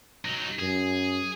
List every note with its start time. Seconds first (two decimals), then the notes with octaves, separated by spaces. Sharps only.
0.25 F#3 D#4
0.59 F#2 G#4